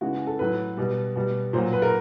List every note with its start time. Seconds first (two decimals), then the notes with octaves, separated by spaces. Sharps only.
0.01 C#3 E3 G#3 F#4
0.27 A4
0.39 A2 F#3 B4
0.77 B2 G3
1.16 B2 G3
1.53 A#2 F#3 C5
1.73 B4
1.82 A#4